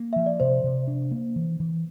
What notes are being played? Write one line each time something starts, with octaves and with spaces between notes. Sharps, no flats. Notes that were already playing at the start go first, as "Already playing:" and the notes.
Already playing: A#3
F3 E5
D5
C3 C5
C3
D4
A#3
E3
E3